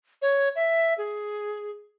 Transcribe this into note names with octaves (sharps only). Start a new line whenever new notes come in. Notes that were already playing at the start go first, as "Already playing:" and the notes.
C#5
E5
G#4